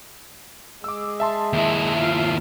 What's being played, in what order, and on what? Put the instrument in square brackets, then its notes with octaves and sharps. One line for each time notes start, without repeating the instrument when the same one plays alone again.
[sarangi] G#3 [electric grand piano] D6 E6
[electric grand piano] E5 A5 C6
[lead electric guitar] D#2 E4
[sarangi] F4